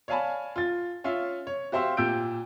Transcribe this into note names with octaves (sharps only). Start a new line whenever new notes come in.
C#5 D5 F5 G#5 A5 B5
F4 A6
C#4 F4 E5 F5
C#5
F#4 G4 C5 E5 F5
A#2 G4 E6 G6 D7